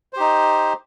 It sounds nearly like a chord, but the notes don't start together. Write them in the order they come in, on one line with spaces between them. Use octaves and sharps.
C5 G4 D#4